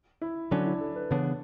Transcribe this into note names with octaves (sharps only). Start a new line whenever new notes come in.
E4
D3 F#3 C#4 D4
E4
A4
B4
C#3 E3 B3 D4 C#5